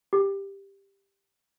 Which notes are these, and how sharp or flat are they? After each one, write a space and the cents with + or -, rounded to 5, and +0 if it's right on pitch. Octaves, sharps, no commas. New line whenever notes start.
G4 +10